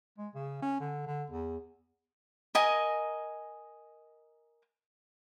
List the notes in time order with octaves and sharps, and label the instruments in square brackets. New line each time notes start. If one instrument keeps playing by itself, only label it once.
[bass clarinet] G#3
C#3
C#4
D3
D3
E2
[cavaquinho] A#4 D#5 G#5 A#5